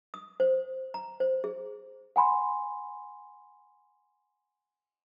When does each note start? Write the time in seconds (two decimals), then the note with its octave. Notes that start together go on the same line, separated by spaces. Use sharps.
0.14 D#6
0.40 C5
0.94 A#5
1.20 C5
1.44 G#4
2.16 F#5 G#5 B5 C6